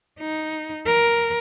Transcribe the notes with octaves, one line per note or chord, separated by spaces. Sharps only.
D#4
A#4